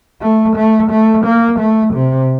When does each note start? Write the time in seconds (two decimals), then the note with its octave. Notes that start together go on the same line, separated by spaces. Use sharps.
0.22 A3
0.56 A3
0.91 A3
1.25 A#3
1.59 A3
1.94 C3